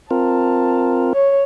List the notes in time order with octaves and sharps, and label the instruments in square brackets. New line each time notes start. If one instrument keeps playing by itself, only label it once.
[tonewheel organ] C4 F4 A#4 [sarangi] A5
[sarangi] C#5